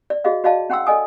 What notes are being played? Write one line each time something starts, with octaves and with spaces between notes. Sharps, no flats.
D5
F#4 G#4 D#5 F5
F#4 D5 D#5 F5 A5
C#4 F#5 G5 C6 E6
A4 D5 D#5 G#5 D#6